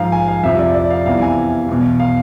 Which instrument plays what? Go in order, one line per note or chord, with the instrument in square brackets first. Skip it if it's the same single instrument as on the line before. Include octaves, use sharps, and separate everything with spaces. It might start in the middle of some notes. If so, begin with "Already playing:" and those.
Already playing: [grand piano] G#2 F3 F5
G#5
F5
F2 C3 F3 E5
D5
D5
F5
E2 C3 E3 F5
G#5
E2 B2
F5